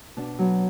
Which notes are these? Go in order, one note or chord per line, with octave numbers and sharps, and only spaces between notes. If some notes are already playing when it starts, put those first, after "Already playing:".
B2 D4
F#3 B3